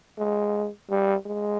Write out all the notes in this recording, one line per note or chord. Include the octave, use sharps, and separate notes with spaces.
G#3
G3
G#3